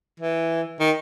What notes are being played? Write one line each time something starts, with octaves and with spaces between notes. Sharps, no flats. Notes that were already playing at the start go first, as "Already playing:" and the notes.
E3
D#3